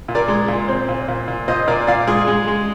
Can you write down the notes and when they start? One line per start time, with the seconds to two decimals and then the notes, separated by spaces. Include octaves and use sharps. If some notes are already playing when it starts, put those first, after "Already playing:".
0.08 A#2
0.15 A#4 D5
0.28 G#3
0.48 A#2
0.69 C4
0.89 A#2
1.08 A#2
1.28 A#2
1.48 A#2 C5 D#5
1.68 A#2 A#4 D5
1.87 A#2 D5 F5
2.07 G#3 F4 G#4
2.27 G#3
2.48 G#3